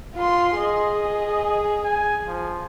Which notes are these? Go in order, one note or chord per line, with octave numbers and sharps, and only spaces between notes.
F4 C6
G#4 D#5
G#5
F3